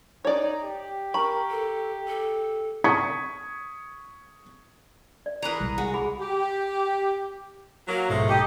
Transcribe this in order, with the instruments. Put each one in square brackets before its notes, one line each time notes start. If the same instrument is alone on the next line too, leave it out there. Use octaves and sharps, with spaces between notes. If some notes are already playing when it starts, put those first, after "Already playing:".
[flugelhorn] D#4 [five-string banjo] C#5 D5
[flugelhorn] G4
[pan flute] A#4 [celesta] A#5 C#6 [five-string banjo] B5
[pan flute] A4
A4
[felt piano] C#6 D#6 G#6 B6 C#7
[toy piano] D5
[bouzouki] E3 G#4 A#4 [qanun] B4 A#5
[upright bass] C2
[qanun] G#3 [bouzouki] F#4
[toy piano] G#4 B5 D6
[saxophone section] G4
F#3 A#3
[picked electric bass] A#1 G#2 B2 [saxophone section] F3 G#3 A3
[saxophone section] D#4 A4 D#5 [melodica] G4